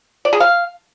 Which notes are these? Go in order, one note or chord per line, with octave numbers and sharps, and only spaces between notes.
D5
G#4
F5